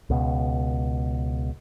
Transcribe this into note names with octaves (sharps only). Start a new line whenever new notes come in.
C#2 B2